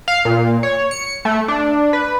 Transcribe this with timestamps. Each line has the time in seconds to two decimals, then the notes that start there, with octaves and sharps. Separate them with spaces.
0.08 F5
0.25 A#2
0.63 C#5
0.91 C#7
1.25 A3
1.48 D4
1.93 B4